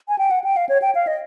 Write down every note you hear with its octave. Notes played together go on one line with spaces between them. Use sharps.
G#5
G5
F#5
G5
F5
C#5
G5
F5
D#5